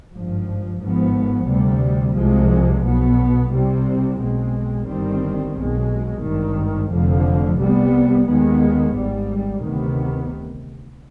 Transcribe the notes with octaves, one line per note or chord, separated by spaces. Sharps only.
G#1 G2 F3
G#1 G#2 F3 B3
D2 C3 G3
C2 C3 F3 G#3
B1 B2 B3
C2 C3 G3 C4
B1 B2 G#3 C4
G1 G2 D#3 G3 C4
B1 B2 G#3
G#1 G2 D#3
F1 F2 D3 F3
C2 C3 G3 B3
D#2 D#3 G#3 B3
G#1 G#2 G3
D2 C3 D#3 B3